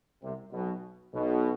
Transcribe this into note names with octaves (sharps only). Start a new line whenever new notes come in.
C2 C3
B1 B2
B1 B2